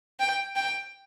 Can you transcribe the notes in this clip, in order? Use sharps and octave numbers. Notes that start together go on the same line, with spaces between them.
G5
G5